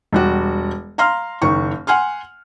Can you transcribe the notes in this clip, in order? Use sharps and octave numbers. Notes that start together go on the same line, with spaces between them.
E1 G3 F#4
F5 A#5 C6 F6
F#1 D#3 C#6
F#5 G#5 C6 F6